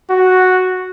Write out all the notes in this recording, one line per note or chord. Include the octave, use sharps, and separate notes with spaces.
F#4